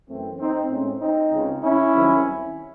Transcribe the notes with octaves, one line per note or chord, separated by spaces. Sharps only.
F#2 E3 A3 C4
C4 D#4
A2 G#3 C4 C#4
C4 D#4
C#2 C#3 G#3
C#4 E4
C2 C3 D#3 F#3